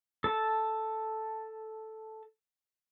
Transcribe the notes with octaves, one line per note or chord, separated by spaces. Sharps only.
A4 A5